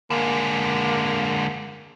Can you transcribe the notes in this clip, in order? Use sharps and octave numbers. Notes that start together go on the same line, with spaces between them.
D3 G#3 A#3